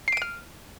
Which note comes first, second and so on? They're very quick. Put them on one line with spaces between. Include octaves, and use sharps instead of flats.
C7 D7 D#7 F6